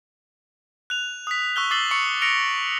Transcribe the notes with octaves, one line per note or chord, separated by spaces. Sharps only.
F#6 F7
D#6 B6
C#6 E6 F#6 G7
D6 E6 A6 C7 F#7 G7
C#6 C#7
E6 A#6 C#7 D7 F7